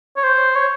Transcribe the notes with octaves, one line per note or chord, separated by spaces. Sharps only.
C#5
C5
C#5